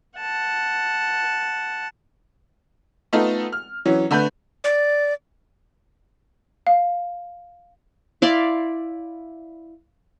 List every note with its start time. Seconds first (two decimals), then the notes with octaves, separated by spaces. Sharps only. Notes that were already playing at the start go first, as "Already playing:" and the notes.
0.19 F#5 A5
3.13 A3 B3 D#4 F4 A4
3.52 F6
3.85 E3 F#3 C#4
4.11 D3 A3 B4 G6
4.64 D5
6.67 F5
8.22 E4 D5 F5 C6